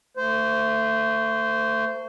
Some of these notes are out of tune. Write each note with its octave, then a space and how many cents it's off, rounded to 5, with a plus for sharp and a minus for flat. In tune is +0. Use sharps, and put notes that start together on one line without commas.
A3 +25 C5 -15